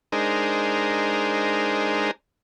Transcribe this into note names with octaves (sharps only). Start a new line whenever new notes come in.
G#3 D4 D#4 G#4 A#4 C5